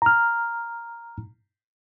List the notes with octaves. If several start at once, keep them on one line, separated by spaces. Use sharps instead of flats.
A#5 F6